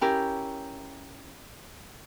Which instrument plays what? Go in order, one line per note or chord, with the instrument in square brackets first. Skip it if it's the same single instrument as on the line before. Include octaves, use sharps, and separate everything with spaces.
[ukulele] C#4 E4 G4 A#4